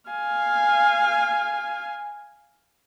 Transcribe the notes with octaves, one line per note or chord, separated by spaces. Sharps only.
F5 G#5